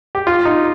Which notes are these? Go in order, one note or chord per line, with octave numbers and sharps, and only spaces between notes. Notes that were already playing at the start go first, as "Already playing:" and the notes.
G4
F4
D#4